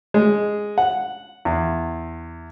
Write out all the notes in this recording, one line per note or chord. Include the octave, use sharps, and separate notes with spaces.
G#3
F#5
E2